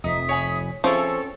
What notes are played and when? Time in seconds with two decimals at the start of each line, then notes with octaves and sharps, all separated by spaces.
0.04 F1 F2 D#4 E5 D#6
0.29 C#5 G#5 B5
0.84 F3 C4 C#4 E4 G#4 A4 C#5